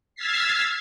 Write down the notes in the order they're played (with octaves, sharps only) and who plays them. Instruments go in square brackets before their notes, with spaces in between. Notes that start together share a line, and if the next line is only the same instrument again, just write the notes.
[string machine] E6 F6 G#6 A6 B6 C7